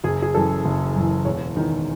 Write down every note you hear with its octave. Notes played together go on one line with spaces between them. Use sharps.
F#1 G#4
G#4
F#2 E3 A4
F#1
F#2 E3
E1 C#5
E2 D#3